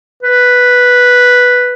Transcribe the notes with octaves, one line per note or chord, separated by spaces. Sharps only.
B4